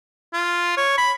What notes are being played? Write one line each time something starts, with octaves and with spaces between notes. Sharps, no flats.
F4
C#5
B5